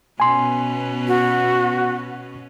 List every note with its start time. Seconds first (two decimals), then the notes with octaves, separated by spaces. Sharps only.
0.20 B2 B3 C#4 G#5 C6
1.08 F#4